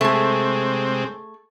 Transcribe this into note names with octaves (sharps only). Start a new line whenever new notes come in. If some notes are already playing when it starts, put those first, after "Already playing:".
C3 G#3 A3 C4 G#4